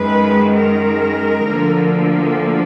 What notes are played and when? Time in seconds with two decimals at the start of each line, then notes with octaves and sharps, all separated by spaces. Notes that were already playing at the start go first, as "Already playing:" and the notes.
Already playing: F#2 D#3 G#3 B4
0.54 A#4
1.46 D2 D3 F3 A#3